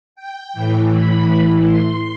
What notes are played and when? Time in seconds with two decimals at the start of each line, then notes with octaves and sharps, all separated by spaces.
0.16 G5
0.54 A2 E3
0.92 B5
1.67 C6